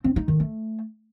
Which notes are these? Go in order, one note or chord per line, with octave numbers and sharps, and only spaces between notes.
C4
D#4
D#3
A3